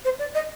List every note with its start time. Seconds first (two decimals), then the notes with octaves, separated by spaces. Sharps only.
0.05 C5
0.19 D5
0.35 D#5